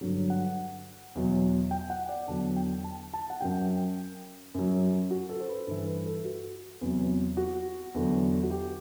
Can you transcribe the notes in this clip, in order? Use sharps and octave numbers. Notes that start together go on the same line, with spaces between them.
G2 D3 F#3
F#5
E2 B2 F#3
G5
F#5
D5
E2 D3 F#3 A5
G5
A5
A5
F#5
F#2 F#3 G5
F#2 F#3
F#4
A4
C5
B4
G2 E3 A4
B4
A4
F#4
E2 C3 F#3
F#4
E2 D3 F#3
F#4
G4